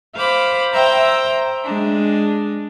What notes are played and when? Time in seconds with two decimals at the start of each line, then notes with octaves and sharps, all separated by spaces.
0.15 C5 F5 B5 D6
0.73 C5 E5 G5 A#5
1.64 G#3 D4